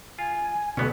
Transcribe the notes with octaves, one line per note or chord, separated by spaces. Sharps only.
F4 G#5
D2 B2 D3 B3 C#4